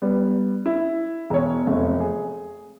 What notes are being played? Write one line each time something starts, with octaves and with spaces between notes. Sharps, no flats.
G3 B3
E4
E1 C#5
F1 A3
G#4